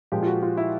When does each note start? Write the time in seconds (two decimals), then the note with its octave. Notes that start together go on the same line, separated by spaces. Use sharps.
0.12 A#2 F3 G#3 G4
0.23 F4
0.27 F#4
0.43 F4
0.57 E4